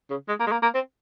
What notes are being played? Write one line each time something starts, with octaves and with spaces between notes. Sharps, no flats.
C#3
G#3
A#3
G#3
A#3
A#3
C4